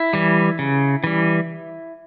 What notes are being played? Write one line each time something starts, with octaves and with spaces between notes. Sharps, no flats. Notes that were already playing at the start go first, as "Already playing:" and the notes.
Already playing: E4
E3 G3
C#3
E3 G3